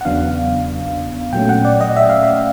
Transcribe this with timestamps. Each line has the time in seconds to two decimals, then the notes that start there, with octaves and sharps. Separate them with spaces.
0.01 F#5
0.05 E2 C#3 F#3 B3 D4 F5
1.33 A#2 F#3 A3 C#4 G5
1.49 F#5
1.65 D5
1.81 D#5
1.97 E5
2.10 F5
2.23 E5